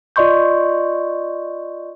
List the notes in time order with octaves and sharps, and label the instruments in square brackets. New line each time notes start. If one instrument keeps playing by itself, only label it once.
[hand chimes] F4 D5 D#5 C6 C#6 G6